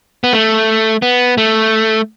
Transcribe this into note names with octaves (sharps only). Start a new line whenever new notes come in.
B3
A3
B3
A3